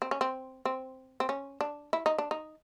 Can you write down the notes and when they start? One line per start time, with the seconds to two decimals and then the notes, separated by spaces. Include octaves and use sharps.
0.02 C4
0.11 C#4
0.21 C4
0.65 C4
1.20 C4
1.29 C#4
1.61 D4
1.93 E4
2.06 D#4
2.18 D4
2.31 D#4